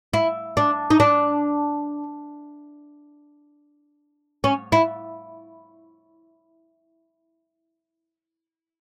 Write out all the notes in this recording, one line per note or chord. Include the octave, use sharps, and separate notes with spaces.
E4
D4
D#4
D4
C#4
E4